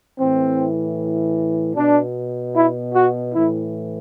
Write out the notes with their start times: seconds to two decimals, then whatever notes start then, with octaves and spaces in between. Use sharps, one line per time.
0.18 A2 E3 C4
1.76 B2 D4
2.55 E4
2.94 F#4
3.35 A2 E3 E4